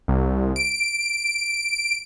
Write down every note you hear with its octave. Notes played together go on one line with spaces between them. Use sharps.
C2
D7